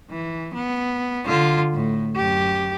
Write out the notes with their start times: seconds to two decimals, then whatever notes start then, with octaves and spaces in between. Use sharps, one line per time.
0.11 E3
0.54 B3
1.25 D3 F4
1.74 A2
2.16 F#2 G4